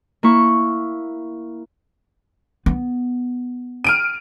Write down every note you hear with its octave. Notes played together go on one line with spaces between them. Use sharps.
A#3 E4 C#6
B3
F6 D7 D#7